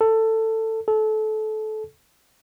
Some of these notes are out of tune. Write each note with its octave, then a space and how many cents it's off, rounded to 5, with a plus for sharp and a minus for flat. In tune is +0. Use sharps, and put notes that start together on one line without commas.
A4 +15
A4 -25